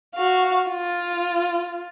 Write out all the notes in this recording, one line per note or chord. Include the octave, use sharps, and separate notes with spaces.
F#4 F5
F4